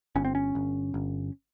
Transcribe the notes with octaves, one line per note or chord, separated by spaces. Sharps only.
G1 C#4
C4
C#4
G1
G1